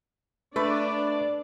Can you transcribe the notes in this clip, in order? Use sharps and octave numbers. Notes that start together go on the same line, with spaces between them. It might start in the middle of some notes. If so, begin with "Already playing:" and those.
A3 D4 B4 D5